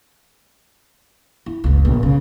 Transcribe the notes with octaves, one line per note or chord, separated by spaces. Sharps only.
E4
F#1 C#2
A#1
C#3